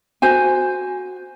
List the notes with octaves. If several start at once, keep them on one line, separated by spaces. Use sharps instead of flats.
F#4 C5 G#5